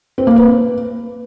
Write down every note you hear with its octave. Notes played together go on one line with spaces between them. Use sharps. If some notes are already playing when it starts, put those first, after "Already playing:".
C4
A#3
B4